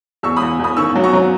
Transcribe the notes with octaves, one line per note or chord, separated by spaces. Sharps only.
E2 C#6 E6
E2 B5 D#6
E2 B5 D#6
D#3 C#6 E6
F#3
A#5 C#6
F#3